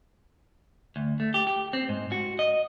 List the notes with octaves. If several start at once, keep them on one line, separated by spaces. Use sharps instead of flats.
D2
A3
G4
G4
C4
G#2
F#4
D#5